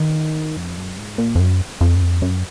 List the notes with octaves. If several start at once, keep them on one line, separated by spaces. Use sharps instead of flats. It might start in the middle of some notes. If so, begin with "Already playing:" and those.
Already playing: D#3
F2
F#2
G#2
A#2
F2
F#2
F2
F#2
F2
F#2